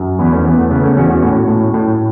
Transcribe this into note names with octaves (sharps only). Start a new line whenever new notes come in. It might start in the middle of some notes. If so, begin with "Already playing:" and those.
Already playing: F#2
E2 B3 E4
A3 C#4
E2 B3
A3
C#3 B3
A3 C#4
E2 C#4 F#4
C#4 F#4
A2
A2
A2